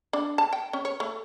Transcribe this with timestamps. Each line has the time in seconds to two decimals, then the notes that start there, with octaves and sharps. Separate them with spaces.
0.13 D4
0.38 A5
0.53 G5
0.73 C#4
0.85 C#5
1.00 A3